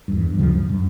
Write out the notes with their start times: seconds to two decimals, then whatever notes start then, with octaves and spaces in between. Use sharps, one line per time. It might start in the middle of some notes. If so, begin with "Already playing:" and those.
0.08 E2 G2
0.38 D2 C#3 F3 F#3
0.54 G2
0.69 F#2